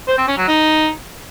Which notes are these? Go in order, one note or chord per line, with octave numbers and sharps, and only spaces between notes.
C5
C4
C#4
F#3
D#4